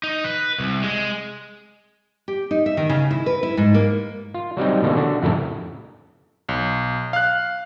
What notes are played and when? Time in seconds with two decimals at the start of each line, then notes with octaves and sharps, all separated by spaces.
0.04 D#4
0.24 B4
0.60 C2
0.83 G#3
2.28 G4
2.51 D#4
2.66 E5
2.77 D#3
2.89 C#3
3.11 E4
3.26 B4
3.43 E4
3.57 G#2
3.74 A#3
4.34 F4
4.57 F#3 G3 C4 D#4
4.82 B2 D3 E3 A#3 C#4
4.97 D3 F#4
5.22 F2 A2 C#3 E4 A4 A#4
6.49 B1
7.13 F5 F#6